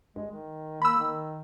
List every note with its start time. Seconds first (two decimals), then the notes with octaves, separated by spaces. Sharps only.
0.16 G1 G#3
0.30 D#3
0.82 A#3 B5 E6
0.98 D#3